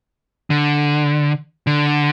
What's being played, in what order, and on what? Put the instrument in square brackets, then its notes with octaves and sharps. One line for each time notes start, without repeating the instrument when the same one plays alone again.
[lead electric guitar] D3
D3